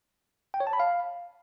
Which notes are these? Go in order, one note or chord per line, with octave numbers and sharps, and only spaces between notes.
G5
C#5
A5
B5
F5